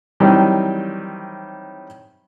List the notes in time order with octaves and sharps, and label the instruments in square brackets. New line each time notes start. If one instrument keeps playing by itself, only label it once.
[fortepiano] D#3 E3 F#3 G3 C4 D#4